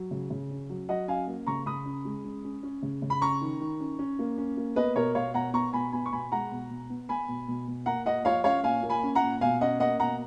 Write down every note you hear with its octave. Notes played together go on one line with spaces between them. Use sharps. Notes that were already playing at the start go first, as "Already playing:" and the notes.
Already playing: F#3
C#3
C#3
C#4
F#3
F#3 D#5 F#5
C#4 F5 G#5
A#3
C#3 A#5 C#6
C#3 B5 D#6
C#4
G#3
C#4
C#4
C#4
C#3
C#3
B5
C#4 A#5 C#6
D#3
D#3
C#4
C#4
A#3
C#4
A#3
B3 B4 D#5
B2 A#4 C#5
B2 C#5 F5
B2 F#5 A#5
B3 A#5 C#6
B2 G#5 B5
B3 G#5 B5
C#6
B2 G#5 B5
G#3 F#5 A#5
B2
B2
B3
B3 G#5 B5
B2
B2
B2
A#3 F#5 A#5
A#2 D#5 F#5
F3 C#5 F5
C#4 C#5 F5
A#2 F5 G#5
A#3
G#5 B5
C#4
F#5 A#5
A#2
B2 F5 G#5
C#4 D#5 F#5
A#3 D#5 F#5
B2 F#5 A#5